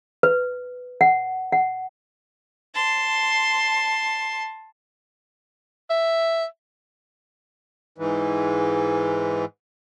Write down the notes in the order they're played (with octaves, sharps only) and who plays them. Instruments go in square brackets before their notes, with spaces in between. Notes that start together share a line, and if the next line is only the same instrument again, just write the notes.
[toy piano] B4
F#5
F#5
[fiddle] A5 C6
[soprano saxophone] E5
[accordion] G#2 E3